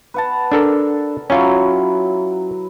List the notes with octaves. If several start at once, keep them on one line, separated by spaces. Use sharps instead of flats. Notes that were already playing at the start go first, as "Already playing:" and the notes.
B4 F#5 A5
D4 A4 A#4
F#3 C#4 E4 F4